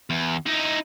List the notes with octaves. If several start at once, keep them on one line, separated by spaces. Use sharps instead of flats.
E2
D#4 E4